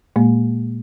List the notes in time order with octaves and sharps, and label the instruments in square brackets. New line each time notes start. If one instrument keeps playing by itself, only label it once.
[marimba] A#2 G#3 A#3